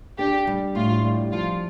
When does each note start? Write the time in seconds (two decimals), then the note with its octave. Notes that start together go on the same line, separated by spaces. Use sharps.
0.18 D4 G4
0.47 G3
0.75 A2 F4
1.04 G3
1.32 F3 F4